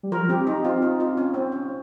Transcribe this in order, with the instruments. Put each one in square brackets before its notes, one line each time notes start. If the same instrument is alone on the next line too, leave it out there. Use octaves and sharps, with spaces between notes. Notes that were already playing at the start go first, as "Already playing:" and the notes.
[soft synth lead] G3
[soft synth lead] F3 [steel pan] A#4
[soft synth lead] C4 [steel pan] G4
[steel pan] D#4
[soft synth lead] C4 [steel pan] F4
[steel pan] D#4
F4
C#4
C4
C#4